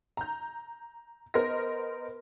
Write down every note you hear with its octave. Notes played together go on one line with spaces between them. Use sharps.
A#5 G6
B3 A#4 C5 D#5 F6 A#6